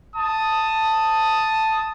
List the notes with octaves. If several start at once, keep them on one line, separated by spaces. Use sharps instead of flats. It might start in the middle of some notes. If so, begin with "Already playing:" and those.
A5 D#6